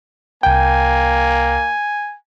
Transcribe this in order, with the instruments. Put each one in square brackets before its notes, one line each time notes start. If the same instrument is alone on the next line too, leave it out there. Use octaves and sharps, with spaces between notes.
[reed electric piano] C2 G5 [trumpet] A#3 [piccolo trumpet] G#5